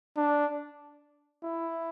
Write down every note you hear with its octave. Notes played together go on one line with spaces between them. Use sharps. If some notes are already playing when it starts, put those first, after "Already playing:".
D4
E4